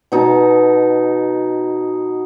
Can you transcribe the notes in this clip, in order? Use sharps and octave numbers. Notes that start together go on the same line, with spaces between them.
B2 D#4 A5